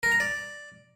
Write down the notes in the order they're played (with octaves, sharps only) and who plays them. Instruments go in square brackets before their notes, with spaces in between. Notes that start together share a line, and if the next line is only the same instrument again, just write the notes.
[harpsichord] A#4
A#5
D5